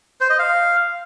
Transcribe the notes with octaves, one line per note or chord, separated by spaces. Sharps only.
C5
D#5
F5